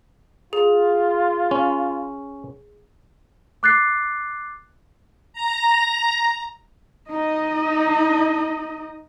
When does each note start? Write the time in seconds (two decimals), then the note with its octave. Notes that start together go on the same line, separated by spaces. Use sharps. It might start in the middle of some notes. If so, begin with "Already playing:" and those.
0.53 F4 G#4
1.51 C#4
3.63 D6 F#6 A6 C7
5.33 A#5
7.10 D#4 D#5